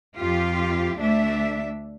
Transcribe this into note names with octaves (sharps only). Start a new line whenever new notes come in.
F2 F4 G4
D2 A3 D4 E5